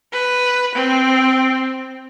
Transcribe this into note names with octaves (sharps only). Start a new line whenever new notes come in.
B4
C4